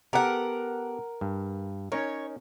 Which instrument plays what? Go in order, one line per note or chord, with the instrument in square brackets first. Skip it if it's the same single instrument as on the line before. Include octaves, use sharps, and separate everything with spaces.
[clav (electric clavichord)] B3 G4 A4 [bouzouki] A#4 F#5
[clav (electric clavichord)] G2
[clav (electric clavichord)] C#4 D#4 A#4 [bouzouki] C#5